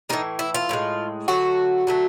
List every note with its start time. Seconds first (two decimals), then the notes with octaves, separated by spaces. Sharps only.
0.09 A2 E3 G#3 D#4
0.39 E4
0.55 F4
0.69 A2 E3
0.73 G#3
1.28 D3 F#3 A3 F#4
1.87 D3 F#3 A3